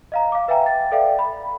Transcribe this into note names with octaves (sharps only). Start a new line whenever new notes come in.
D#5 F5 A#5
F5 D6
B4 E5 F5 G5 G#5 A#5
G5 A6
A4 D5 E5 F5 G5
B5